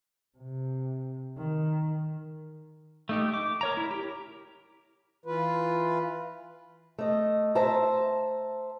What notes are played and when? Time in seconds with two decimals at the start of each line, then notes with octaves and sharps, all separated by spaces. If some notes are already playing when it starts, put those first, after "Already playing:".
0.38 C3
1.38 D#3
3.09 A3 D#4 G4
3.34 D6
3.61 A#4 C#5 A#5
3.77 E4
3.91 G4
5.26 E3 F4 B4
6.98 A3 D#5
7.55 C5 E5 A5 A#5